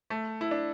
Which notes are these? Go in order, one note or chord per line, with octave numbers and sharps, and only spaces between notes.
A3
E4
D4